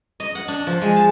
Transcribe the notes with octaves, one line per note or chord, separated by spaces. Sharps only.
D#5
F#5
D4
F3
G#3
A5